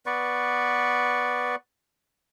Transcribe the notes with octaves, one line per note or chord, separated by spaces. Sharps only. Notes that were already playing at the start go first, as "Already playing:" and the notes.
B3 B4 D5 C#6